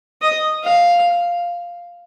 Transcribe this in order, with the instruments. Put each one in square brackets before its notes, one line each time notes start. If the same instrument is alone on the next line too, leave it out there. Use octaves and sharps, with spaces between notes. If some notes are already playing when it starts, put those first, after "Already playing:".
[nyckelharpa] D#5
F5